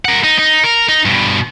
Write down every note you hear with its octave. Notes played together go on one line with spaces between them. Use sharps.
A#4 F#5
D#4
D#4
A#4
D#4
G2 B2